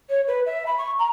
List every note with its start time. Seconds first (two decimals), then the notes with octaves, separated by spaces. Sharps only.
0.10 C#5
0.28 B4
0.46 E5
0.67 B5
0.78 C#6
0.99 A#5